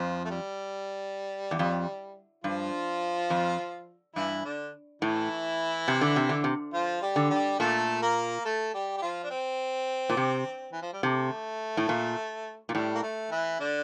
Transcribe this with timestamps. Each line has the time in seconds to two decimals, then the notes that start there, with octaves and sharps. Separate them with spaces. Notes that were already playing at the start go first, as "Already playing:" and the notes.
Already playing: F2 F3
0.25 A3
0.31 G3
1.51 E2
1.59 F2
2.44 G2 F3 F4
3.30 F2
4.16 G2 E3 E4
4.45 D3 D4
5.02 A2 E3 E4
5.88 C3
6.01 D3
6.16 C3
6.29 D3
6.44 C3
6.73 F3 F4
7.02 G3 G4
7.16 D3
7.30 G3 G4
7.59 A#2 A3 A4
8.02 A#3 A#4
8.45 A3 A4
8.74 G3 G4
8.97 G4
9.02 F3 F4
9.24 D4
9.30 C4
10.10 A#2
10.17 C3
10.73 E3
10.82 F3
10.93 G3
11.03 C3 A3
11.77 A2
11.89 A#2
12.69 A#2
12.74 A2 G3
12.95 A#3
13.03 A3
13.31 E3 E4
13.60 D3 D4